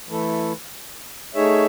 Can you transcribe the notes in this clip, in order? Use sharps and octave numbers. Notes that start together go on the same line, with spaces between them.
E3 A3 E4 A4
A3 D#4 G#4 C#5 E5